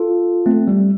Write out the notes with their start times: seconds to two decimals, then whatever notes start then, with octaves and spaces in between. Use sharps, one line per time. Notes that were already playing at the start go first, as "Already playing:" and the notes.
Already playing: F4 A4
0.46 A3 C4
0.68 G3